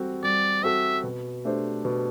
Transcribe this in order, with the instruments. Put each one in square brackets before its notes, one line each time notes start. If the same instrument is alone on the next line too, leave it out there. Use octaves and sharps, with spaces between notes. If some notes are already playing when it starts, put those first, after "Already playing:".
Already playing: [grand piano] G3 C4 F#4 A4
[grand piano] G3 [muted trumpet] D5
[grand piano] C4 F#4 A4 [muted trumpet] E5
[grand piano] B2
A3 D4 G4 C5
B2